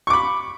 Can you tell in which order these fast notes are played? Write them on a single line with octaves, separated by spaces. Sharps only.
C#6 D6 B5